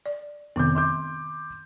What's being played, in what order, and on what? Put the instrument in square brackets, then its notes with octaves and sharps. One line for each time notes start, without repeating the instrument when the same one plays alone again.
[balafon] D5
[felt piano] F1 D6 G6 [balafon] D#3 B3
[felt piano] C6 D6 G6